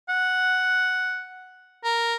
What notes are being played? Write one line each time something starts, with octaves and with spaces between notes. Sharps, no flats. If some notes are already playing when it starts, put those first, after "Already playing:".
F#5
A#4